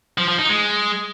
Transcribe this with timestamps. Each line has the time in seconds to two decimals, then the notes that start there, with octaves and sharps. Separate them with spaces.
0.18 F3
0.28 F3
0.39 D#4
0.49 G#3